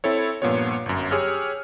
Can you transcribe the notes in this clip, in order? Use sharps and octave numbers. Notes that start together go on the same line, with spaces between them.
C4 E4 A4 C#5
G2 A#2 F3 B3 F4 C#5
G1 F#2
G4 G#4 C#5 E6 F6